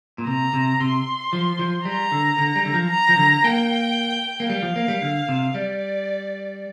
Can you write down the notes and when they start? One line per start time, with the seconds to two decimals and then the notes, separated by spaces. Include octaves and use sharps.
0.18 A#2
0.27 C3 A#5
0.53 C3
0.80 C3 C6
1.33 F3
1.59 F3
1.85 G3 A#5
2.12 D3
2.38 D3
2.56 G3
2.65 D3
2.74 F3
2.91 A#5
3.09 F3
3.17 D3
3.44 A#3 G5
4.40 A#3
4.49 G3 F5
4.63 F3
4.76 A#3
4.88 G3
5.02 D3
5.29 C3
5.54 G3 D5